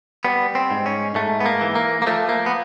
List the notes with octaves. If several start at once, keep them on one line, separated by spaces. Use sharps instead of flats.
G3 B3
C4
G#2
C#4
G#2 A3
B3
A#3
E3
A#3
A#3
F3 A3
A#3
B3